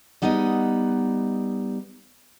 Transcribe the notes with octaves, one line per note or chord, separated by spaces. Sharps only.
G3 B3 D#4 B4 D#5